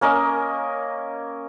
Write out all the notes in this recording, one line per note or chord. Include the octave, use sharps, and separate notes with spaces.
A#3 C#4 A#4 D#5